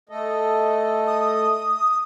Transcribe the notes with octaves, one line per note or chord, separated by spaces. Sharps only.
A3 A4 D#5
D#6